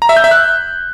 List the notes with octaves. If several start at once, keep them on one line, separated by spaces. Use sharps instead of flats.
A#5
E5
G6
E5
F#6